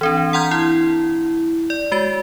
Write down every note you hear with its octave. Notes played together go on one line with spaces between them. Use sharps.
E3 C4 D4
F#5 A#5 C6 F6 G6 G#6
E4
D5
G#3 F#4 A6